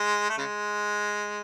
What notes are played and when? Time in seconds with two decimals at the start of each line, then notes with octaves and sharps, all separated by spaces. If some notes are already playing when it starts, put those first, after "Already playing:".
Already playing: G#3
0.29 A3
0.38 C#3 G#3